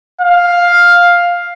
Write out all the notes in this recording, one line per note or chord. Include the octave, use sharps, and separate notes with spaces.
F5